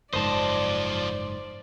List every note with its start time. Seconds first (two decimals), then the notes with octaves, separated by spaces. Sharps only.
0.13 F#1 G#2 F3 C5 D5 D#5 A5